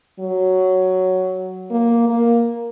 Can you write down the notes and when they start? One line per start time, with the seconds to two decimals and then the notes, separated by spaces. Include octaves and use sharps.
0.20 F#3
1.71 A#3
2.09 A#3